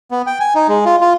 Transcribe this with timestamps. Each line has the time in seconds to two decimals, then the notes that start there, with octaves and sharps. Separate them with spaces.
0.11 B3
0.27 G5
0.40 G#5
0.55 D#4
0.68 G#3
0.85 F4
1.01 F4